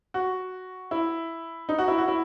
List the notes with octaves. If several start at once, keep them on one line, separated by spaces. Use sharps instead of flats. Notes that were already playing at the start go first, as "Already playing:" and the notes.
F#4
E4
D#4
F#4
E4
F#4
E4